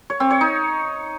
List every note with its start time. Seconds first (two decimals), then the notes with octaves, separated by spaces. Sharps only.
0.10 C#5
0.20 C4
0.30 C#5
0.41 D#4